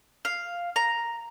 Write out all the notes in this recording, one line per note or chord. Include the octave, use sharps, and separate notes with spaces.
F5
A#5